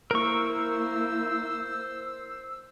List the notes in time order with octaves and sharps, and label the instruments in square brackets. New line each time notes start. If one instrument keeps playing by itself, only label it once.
[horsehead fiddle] A#3 E4 [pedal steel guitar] A#4 C#6 [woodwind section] C5 E6